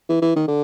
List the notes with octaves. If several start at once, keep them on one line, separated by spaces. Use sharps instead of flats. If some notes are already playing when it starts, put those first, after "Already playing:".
E3
E3
D#3
D3